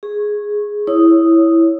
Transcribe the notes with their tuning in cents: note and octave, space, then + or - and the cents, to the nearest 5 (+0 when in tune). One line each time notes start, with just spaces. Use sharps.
G#4 +0 C#6 -20
E4 +0 C#5 +0 D#6 +0